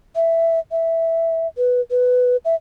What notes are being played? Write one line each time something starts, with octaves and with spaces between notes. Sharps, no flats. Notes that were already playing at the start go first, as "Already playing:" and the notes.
E5
E5
B4
B4
E5